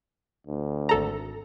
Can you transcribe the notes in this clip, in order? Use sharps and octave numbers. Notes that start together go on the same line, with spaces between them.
D2
G#1 A4 A#5